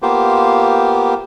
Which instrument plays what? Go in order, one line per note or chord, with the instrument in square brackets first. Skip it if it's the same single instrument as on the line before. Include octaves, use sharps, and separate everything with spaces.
[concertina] A#3 B3 F4 G4 C5